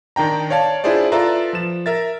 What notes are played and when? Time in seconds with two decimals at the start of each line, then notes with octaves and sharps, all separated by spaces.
0.16 D#3 D4 G5 A#5
0.50 C#5 D5 F5 A5
0.84 D4 E4 F4 G#4 C5 D5
1.12 F4 A4 B4 D5 E5 A#5
1.53 F3 E7
1.86 A#4 E5 A6